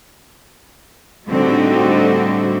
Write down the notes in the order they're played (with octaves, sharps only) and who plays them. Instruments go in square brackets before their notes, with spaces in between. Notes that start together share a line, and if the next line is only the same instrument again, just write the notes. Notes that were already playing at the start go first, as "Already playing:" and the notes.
[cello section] A2 D3 G3 C4 D#4 F#4